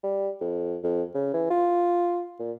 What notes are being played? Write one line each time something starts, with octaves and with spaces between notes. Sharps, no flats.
G3
F2
F2
C#3
E3
F4
A#2